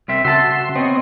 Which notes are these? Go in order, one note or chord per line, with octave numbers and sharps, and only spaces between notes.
C2 C4 E5
C#3 F#4 E5 A5 C6
B3 C4 C#5 D#5